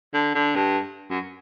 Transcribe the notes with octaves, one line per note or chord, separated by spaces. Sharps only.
D3
D3
G2
F#2